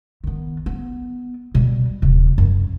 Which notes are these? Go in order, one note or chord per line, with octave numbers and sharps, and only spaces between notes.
D#3 B3
B3
B2 G3
D#1 C3
F#2